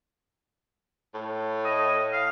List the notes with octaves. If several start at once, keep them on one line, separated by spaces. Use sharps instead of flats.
A2
D#5
F5